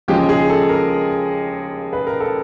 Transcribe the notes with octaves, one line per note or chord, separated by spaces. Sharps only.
D#2 C#3 F3 G#3 G4
G#4
A4
A#4
B4
A#4
A4